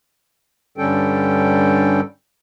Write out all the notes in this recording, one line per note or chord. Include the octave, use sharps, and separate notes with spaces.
G2 D3 G3 C#4 A4 G5